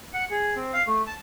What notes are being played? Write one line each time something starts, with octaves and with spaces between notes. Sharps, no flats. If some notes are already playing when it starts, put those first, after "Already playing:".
F#5
G#4
C4
F5
A3
A5